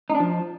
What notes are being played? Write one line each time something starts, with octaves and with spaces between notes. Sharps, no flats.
D#4
D4
F3